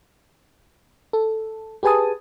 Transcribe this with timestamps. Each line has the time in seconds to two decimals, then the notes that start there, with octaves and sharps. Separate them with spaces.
1.13 A4
1.83 G4 G#4 B4 G#5 A5 D#6